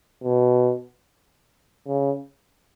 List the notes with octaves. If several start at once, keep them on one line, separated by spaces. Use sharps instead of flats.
B2
C#3